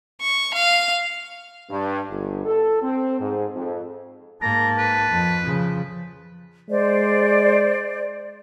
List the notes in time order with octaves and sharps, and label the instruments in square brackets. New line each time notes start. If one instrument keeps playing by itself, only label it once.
[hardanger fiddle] C#6
F5
[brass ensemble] G2
G1
A4
C4
G#2
F2
[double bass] G#2 A#3 [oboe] A5 [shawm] A#5
[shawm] B4
[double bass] F2
C#3 F3
[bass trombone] G#3 [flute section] C5 D5